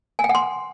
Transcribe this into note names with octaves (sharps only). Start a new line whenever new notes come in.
G#5
G5
F#5
C6